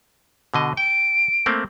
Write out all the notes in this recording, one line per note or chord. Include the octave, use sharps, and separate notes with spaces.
B2 D3 D#5
G5 D7
A3 A#3 C4